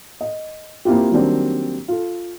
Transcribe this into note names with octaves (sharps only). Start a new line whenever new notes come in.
D#5
A#3 C4 E4 F4 G4
D#3 F#3 G3 A#3 C4 D4
F4 A4